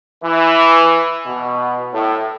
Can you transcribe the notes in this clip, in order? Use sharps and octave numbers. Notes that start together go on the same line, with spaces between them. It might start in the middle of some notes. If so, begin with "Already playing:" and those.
E3
B2
A2